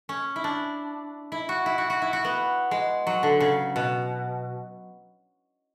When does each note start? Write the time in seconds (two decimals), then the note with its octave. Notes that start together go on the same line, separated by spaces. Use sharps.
0.09 C#4
0.36 E4
0.44 D4
1.32 E4
1.49 F#4
1.66 E4
1.78 F#4
1.90 F#4
2.02 E4
2.13 F#4
2.25 B3
2.71 G#3
3.07 F#3
3.23 D3
3.40 C#3
3.76 B2